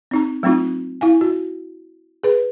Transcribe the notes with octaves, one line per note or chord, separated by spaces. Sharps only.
C4 D#4 A#5
F#3 A3 C4 D#4 F4
E4 F5 G#5
F#4
G#4 B4